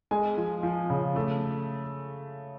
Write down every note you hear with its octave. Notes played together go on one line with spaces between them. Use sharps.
G#3 G#5
F3
F3
C#3
A3